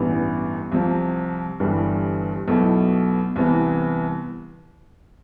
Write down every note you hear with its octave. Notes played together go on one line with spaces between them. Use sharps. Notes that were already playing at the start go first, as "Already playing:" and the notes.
Already playing: A1 G2 E3 B3
C2 C3 F3
G1 G2 E3 G3
B1 B2 A3 E4
C2 C3 E3 B3